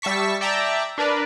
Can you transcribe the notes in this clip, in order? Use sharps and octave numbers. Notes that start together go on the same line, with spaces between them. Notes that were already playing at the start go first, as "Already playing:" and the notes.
G3 E5 A5 C#6 B6
D5 E5 G5 A5 A#5
D4 A#4 B4 D5